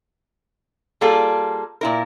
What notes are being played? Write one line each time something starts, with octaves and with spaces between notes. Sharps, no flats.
G3 A#3 F4 G#4 A4
A#2 E4 A#4